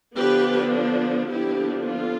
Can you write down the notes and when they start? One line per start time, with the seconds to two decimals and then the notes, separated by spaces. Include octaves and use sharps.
0.17 D3 F3 B3 D4 G4 B4
1.30 D3 F3 B3 D4 E4 G4
1.85 F4 A4